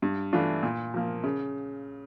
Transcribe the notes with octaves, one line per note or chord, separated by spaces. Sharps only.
G2
E3 A3 D4 F4
A#2
F3 A#3
C#3